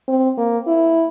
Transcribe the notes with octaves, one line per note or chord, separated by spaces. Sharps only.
C4
A#3
E4